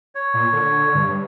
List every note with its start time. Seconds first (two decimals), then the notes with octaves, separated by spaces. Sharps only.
0.15 C#5
0.34 A#2
0.53 D3
0.95 G2